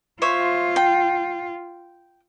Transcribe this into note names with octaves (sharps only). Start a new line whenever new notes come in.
F4 C5 C#5 E5
G5